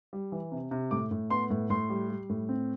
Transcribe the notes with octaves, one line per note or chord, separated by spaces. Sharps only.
G3
E3
C3
C3
A2 D6
A2
B3 C6
A2
A2 C6
G3
G3
A2
C4